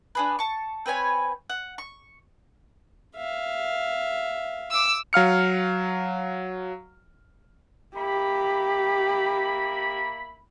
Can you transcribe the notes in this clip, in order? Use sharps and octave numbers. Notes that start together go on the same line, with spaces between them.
D4 G#4 B4
A5 C#6
C4 B4 C#5 G#5
F#5
C#6
E5 F5
D6 E6
F#3 F5 F6 C#7
A#3 E4 G4 B5